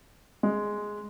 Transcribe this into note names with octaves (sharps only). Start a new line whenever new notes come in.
G#3